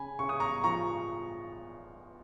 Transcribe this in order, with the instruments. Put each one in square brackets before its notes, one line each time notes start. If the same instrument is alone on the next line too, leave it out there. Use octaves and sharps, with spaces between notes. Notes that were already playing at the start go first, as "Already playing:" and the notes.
Already playing: [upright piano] C#3 G#5 B5
C#3 C#6
D#6
A#5 C#6
F3 A#5 C#6